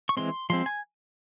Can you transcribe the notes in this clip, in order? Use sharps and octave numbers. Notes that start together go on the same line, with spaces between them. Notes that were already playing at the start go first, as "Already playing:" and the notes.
C#6
E3 G#3 C4 C6
F3 G#3 C4 C6
G#5